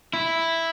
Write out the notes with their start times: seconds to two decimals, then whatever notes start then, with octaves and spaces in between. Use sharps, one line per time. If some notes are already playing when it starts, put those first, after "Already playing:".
0.13 E4